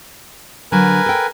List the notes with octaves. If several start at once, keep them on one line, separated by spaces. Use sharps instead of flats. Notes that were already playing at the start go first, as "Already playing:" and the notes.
D3 F#3 A#4 B4 G#5
A4 G5